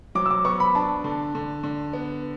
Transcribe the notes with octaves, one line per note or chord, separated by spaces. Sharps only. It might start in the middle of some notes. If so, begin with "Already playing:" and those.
F#3 D6
E6
D6
B3 C#6
B5
D4 A5
D3
D3
D3
B3